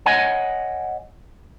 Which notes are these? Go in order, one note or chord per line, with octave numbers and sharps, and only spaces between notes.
C#5 D#5 F#5 G#5